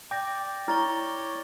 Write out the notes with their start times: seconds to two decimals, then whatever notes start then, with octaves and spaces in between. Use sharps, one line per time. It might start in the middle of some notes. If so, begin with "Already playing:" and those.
0.11 D5 G5 D6 G6 A#6
0.68 E4 C#5 D5 F6 A6 G7